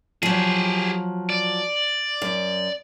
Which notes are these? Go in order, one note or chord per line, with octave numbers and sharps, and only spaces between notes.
F3 F#3 G4 G#4
D5
F#2